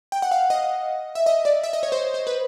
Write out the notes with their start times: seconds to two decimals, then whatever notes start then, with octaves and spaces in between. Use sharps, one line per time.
0.12 G5
0.22 F#5
0.31 F5
0.50 D#5
1.15 E5
1.26 D#5
1.45 D5
1.63 E5
1.73 D#5
1.83 C#5
1.92 C5
2.14 C5
2.27 B4